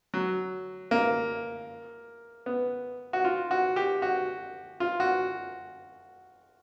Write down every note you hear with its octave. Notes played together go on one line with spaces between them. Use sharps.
F#3
A#3
B3
F#4
F4
F#4
G4
F#4
F4
F#4